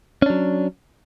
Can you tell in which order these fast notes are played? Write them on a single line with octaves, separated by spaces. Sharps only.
C#4 D4 F#3